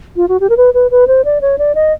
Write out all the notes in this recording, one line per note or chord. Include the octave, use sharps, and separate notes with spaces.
F4
F#4
G4
A#4
B4
B4
B4
C5
D5
C#5
D5
D#5